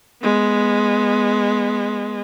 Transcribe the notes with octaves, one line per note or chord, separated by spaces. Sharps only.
G#3 B3